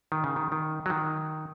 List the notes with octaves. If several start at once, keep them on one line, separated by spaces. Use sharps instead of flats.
D#3
C#3
D#3
D#3
F#3
D#3